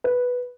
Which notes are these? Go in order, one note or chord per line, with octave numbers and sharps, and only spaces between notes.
B4